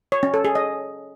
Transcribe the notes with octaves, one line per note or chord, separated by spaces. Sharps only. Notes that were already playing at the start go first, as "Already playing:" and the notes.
C#5
C#4
A4
G#4
D#5